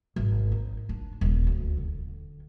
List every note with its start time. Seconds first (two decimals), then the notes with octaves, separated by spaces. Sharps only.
0.16 G#1
0.52 D#4
0.89 D4
1.21 D#1
1.47 D2
1.77 D3